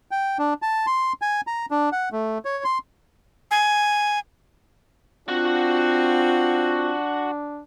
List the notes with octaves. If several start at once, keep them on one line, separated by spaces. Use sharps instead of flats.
G5
D4
A5
C6
G#5
A#5
D4
F#5
A3
C#5
C6
G#5
C4 D4 F4 F#4 F#5